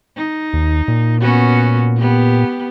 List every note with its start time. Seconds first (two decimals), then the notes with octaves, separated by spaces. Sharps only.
0.17 D#4
0.53 D#2
0.88 A#2
1.21 B3 C#4 F#4
1.97 B3 G4